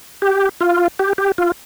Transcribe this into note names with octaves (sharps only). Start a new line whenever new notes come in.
G4
F4
G4
G4
F4